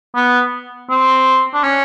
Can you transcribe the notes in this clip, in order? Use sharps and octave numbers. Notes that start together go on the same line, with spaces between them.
B3
C4
D4
C#4